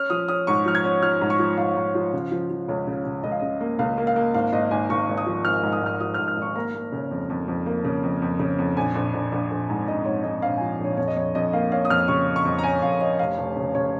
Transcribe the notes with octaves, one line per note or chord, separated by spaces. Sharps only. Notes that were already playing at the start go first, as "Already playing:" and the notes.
Already playing: C#4 F6
F3 D#6
C#4 D#6
G#2 C#6
F3 F6
G#6
C#4
F3 F6
G#2
C#6
F3
G#2 F5
G#2
F3
C#3
F3
F3
C#2 C#5
C#3
C#3
C#2 D#5
F5
C#3 D#5
A#3
C#2 F5
A#3
F5
A#3
G#1 F5
G#1 D#5
G#1 G#5
G#1 C#6
G#1
D#6
F3
G#1 F6
G#2
D#6
G#2 F6
F3 D#6
G#2 F6
F6
G#1 C#6
A#3 A#5
A#3
C#3
F2
F2
F2
A#3
C#3
F2
F2
C#3
F2
A#1 G#5
A#1
A#1
A#1
A#1
G#2
A#1 D#5
G#2 C#5
G#2 D#5
A#1 F5
F3 G#5
A#1
C#5
F2 C#5
D#5
F2 C#5
F2 D#5
A#3 F5
C#4 F5
D#6
F2 F6
C#3 C#6
C#4
C#6
F2
A#5
C#4 G#5
F2 F5
C#4 D#5
F1 F5
F1
C#3
C#3 C#5